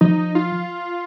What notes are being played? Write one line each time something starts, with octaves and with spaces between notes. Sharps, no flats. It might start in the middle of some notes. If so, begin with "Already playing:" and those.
F3 D#4
F4